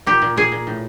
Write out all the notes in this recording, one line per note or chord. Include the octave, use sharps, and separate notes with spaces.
A#2 G4
A#2
A#2 G#4
A#2
A2